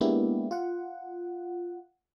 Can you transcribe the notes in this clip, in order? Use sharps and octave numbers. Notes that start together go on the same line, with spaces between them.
G#3 A#3 B3 D4 E4 G4
F4 F#5